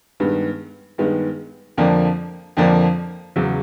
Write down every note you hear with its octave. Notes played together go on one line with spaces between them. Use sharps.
G2 D#3 G#3 B3
G2 D#3 G#3 B3
F2 D3 F3 A#3 D4
F2 D3 F3 A#3 D4
E2 C#3 F#3